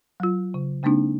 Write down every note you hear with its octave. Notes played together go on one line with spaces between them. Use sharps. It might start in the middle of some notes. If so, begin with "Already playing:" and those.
F#3 F4
C#3
C#3 G#3 A#3 C4 D4 D#4